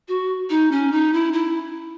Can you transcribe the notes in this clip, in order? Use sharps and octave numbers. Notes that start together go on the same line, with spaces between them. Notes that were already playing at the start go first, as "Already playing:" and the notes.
F#4
D#4
C#4
D#4
E4
E4